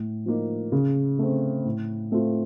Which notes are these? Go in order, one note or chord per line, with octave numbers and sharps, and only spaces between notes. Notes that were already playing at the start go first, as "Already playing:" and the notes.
Already playing: A2
F3 A#3 D#4
C#3
A3 C4
A2
A3 C4 F4